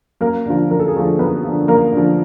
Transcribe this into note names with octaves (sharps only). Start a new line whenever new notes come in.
F#2 A#3 A#4
D3 F3
F#2 A#4
A4
G#4
D3 F3 A3 A4
F#2 B3 B4
D3 F3
F#2 A#3 A#4
D3 F3